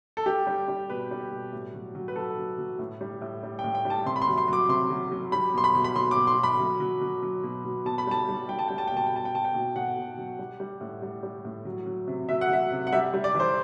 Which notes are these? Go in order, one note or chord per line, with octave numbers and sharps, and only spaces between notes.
A4
G3 G4
G3
G3
B2 B4
G3
B2
A2
F#3
F#3
B4
F#3 A4
F#3
F#3
A2
G3
A2
G3
G5
A2
G5
G3
A5
C3 C6
B5
C6
F#3
C6
F#3
D6
C3 C6
F#3
F#3
G3 B5
B2 C6
B5
B2
B5
B2 C6
D6
B2
C6
B2
B5
F#3
F#3
F#3
F#3
B2
B2
B2 A5
B5
G3 A5
G3
G3 G5
A5
G3 G5
A5
B2 G5
A5
G5
B2 A5
G5
B2 A5
G5
B2
B2 F#5
B2
F#3
G3
G3
A2
G3
G3
A2
F#3
F#3
C3
F#3 E5
F#5
F#3 E5
C3
F#5
G3 E5
G3
D5
E3
C5